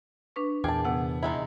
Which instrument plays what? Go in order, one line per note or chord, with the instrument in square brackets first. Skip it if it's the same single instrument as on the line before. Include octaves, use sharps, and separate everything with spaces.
[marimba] D4 B4 C#6
[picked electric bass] E2 [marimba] A#2 [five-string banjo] G#4 A5 [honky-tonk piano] G5
[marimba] C3 F#5 [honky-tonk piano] B3
[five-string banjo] D#3 G#3 E4